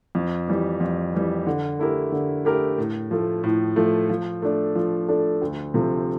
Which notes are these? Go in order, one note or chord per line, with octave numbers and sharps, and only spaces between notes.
F2
E3 G3
F2
E3 G3
D3
A3 E4 G4 A#4
D3
A3 E4 G4 A#4
A2
F3 A3
A2
F3 A3
F3
A3 D4 A4
F3
A3 D4 A4
D2
C3 F3 A3